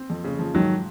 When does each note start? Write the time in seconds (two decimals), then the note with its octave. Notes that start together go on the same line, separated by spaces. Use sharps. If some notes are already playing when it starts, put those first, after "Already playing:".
Already playing: C4
0.10 F2
0.24 C#3
0.39 F3
0.54 G#2 D#3 F#3